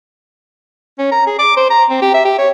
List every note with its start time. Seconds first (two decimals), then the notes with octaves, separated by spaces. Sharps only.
0.99 C#4
1.12 A#5
1.27 G#4
1.39 D6
1.57 C5
1.70 A#5
1.90 C4
2.02 G4
2.14 E5
2.25 G4
2.38 C#5